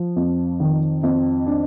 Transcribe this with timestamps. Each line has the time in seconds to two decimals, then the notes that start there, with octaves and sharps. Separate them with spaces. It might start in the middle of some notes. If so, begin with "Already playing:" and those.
Already playing: F3
0.16 F2
0.60 D#3
1.03 F2
1.46 D4